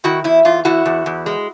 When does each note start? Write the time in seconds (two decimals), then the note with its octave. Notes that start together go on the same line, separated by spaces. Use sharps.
0.04 D#3 E4 F#4
0.24 E2 E4
0.45 E2 F4
0.65 E2 E4 F#4
0.86 E2
1.06 E2
1.26 G#3